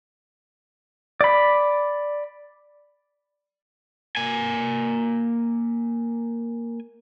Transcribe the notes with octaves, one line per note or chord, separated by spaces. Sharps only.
D5 B5
A#3 G#5